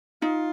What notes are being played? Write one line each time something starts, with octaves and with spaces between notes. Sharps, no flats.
D#4 F4